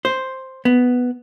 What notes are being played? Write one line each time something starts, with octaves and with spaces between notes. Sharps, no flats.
C5
B3